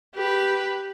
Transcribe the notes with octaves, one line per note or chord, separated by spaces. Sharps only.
G4 B4